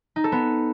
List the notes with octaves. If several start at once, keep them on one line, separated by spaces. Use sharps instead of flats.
D#4
A4
B3